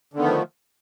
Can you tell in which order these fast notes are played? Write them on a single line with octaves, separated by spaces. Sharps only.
D3 D#3 B3 A3 F3